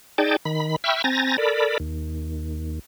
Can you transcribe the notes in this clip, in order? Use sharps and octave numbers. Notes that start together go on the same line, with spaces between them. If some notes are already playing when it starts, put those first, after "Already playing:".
D#4 G#4 D5 G5 A5
D#3 B5
E5 G5 B5 C#6 E6 F6
C4 G#5 A#5 A6 A#6
A4 A#4 D5 B5
D#2